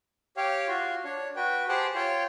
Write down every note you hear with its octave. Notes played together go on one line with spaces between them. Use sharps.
G4 C#5 F5 G5
F4 F#4 C6
D4 C#5
F#4 B4 G5
G4 G#4 C5 F#5 G5 A5
F4 C#5 G5 C6